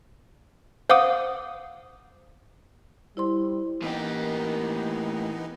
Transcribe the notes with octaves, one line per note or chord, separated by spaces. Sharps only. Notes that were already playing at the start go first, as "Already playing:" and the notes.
C5 F5 F#5 D6 D#6
G3 E4 C5 C6
A2 E3 A#3 B3 D#4 G4 A#4